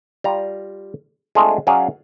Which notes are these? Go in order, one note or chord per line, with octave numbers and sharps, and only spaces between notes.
G3 F4 A#5
G#3 A3 C4 D4 F4 G#4
F#3 C#4 G#4 D5 F5